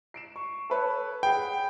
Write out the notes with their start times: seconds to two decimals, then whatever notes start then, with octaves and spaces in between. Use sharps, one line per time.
0.14 C7 D7 E7
0.36 C#6
0.70 A4 B4 C#5
1.23 G#4 F#5 G5 B5